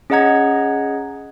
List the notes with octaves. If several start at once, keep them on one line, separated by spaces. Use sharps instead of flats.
C#4 G#4 D#5 F#5 A#5 G#6